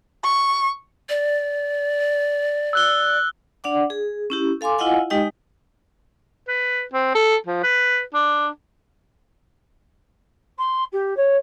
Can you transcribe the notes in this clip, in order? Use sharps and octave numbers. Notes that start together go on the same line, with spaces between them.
C#6
D5
E6 F#6 G7
D4 D5 F#5 D6
G#4
C#4 E4 G4
A4 F5 G#5 C6 D6
E4 F4 D#5 F5 F#5 G#5
G#3 D#4 G4 D#5 G5
B4
C4
A4
F3
B4
D4
C6
G4
C#5